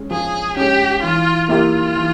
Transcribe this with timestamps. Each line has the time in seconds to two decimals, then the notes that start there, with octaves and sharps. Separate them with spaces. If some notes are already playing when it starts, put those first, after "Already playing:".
Already playing: G#3 C#4
0.10 F3 G#4
0.57 G#3 C#4 G4
1.02 E3 F4
1.48 A#3 E4 F4 G4
1.96 E3